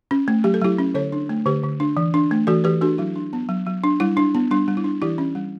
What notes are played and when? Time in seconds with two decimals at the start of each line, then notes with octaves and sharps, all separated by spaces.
0.11 C#4
0.28 A3
0.44 F#3 G4
0.54 A4
0.61 F#3 E4 G4
0.78 C#4
0.94 D3 A4 C#5
1.12 D4
1.29 A3
1.46 D3 G4 B4
1.63 D3
1.80 D4
1.97 E3
2.14 D4
2.31 A3
2.47 E3 F#4 A4
2.64 E3 G4 B4
2.81 D4 F#4 A4
2.98 F#3 E4
3.16 D4
3.33 B3
3.49 F#3
3.66 F#3
3.84 D4
4.00 G3 E4
4.17 D4
4.35 B3
4.51 G3 D4
4.68 G3
4.77 E4
4.84 D4
5.02 E3 E4 G4
5.18 C#4
5.35 G3